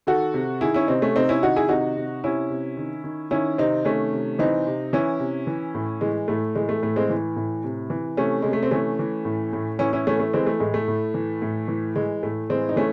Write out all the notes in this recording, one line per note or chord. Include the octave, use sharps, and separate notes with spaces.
D#3 F#4 A4
C3
D#3 E4 G#4
C#4 E4
C3 C4 D#4
A3 C#4
C3 C4 D#4
C#4 E4
D#3 D#4 F#4
E4 G#4
C3 D#4 F#4
C3
C3 C#4 E4
C3
D#3
D#3
D#3 C#4 E4
C3 C4 D#4
D#3 A3 C#4
C3
E3 C4 D#4
C3
E3 C#4 E4
C3
E3
A2
E3 G#3
A2 A3
E3 G#3
A3
A2 A3
G#3 C4
E3
A2
C3
E3
C3 A3 C#4
C3 G#3
A3
C4
E3 A3 C#4
E3
A2
A2
E3 C#4 E4
C#4 E4
E3 A3 C#4
A3
E3 G#3 C4
A3
A2 G#3
A3
A2
E3
A2
E3
E3 G#3
A2 A3
E3 G#3 C4
D#4
E3 A3 C#4